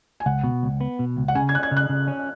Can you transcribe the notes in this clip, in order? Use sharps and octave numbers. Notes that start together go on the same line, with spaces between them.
G#5
C#2 F#5
B2
C#2
B3
B2
C#2
F#5
C#3 G#5
G#6
C#4 F#6
G#6
C#3
F#6
C#3
C#4